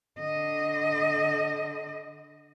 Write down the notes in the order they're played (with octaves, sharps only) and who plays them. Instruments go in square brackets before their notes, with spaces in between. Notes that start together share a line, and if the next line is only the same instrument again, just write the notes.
[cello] D3 D#5